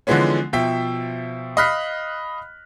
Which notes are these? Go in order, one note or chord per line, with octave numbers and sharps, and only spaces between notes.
D3 E3 F3 G#3 B3 C#4
B2 F3 E5 G5 B6
D#5 F5 B5 F6 F#6 B6